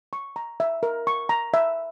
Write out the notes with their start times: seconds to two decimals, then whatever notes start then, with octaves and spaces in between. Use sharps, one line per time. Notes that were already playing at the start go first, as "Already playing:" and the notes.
0.13 C#6
0.36 A#5
0.60 E5
0.83 A#4
1.07 C#6
1.29 A#5
1.54 E5